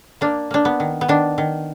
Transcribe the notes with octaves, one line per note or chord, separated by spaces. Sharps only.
A#3 D4
A#3 D4
B3
D#3
B3
D#3 D4
D#3